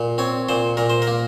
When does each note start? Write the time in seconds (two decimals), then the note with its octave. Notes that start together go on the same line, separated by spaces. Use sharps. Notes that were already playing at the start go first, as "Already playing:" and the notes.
Already playing: A#2
0.18 C4 C#5
0.49 A#2 C5
0.77 A#2 A#4
0.90 C5
1.02 A#4
1.07 A#3